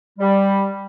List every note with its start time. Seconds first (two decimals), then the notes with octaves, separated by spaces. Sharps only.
0.19 G3